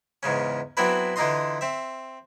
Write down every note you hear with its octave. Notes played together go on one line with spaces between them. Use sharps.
E2 G#2 C#3 C#4
F#3 B3 C4 D4 E4 B4
D3 E3 D#4 F4 D#5 C6
C4 E5